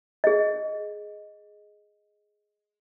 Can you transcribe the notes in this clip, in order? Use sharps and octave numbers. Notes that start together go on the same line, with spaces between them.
G#4 D#5